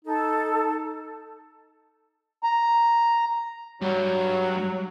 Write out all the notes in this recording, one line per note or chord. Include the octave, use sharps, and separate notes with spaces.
D#4 A4
A#5
G2 F#3